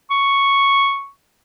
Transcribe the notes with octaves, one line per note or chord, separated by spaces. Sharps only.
C#6